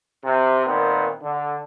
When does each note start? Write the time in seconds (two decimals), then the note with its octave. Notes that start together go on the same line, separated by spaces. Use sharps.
0.24 C3
0.66 A#2 D#3 B3 C4
1.21 D3